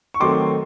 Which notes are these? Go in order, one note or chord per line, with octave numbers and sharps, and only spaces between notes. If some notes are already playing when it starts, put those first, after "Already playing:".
C#6
D#3 F#3 A3 C4 C6 D6